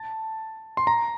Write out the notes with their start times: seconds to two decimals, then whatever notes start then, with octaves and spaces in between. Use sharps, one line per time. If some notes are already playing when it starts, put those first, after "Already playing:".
Already playing: A5
0.77 C6
0.87 A#5